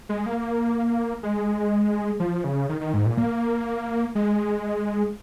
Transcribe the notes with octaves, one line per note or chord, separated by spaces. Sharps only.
G#3
A#3
G#3
F3
C#3
D#3
D#3
G#2
A#2
A#3
G#3